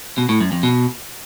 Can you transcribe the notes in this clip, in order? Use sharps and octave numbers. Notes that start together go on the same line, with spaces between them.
B2
A2
F#2
F2
B2